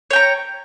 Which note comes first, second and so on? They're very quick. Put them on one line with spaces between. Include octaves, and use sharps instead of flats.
C#5 G5 A#5